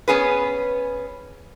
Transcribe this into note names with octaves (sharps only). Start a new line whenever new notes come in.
B3 C#4 G#4 B4